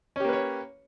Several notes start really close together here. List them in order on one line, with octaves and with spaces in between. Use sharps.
C#4 G4 A#3 B4 C#5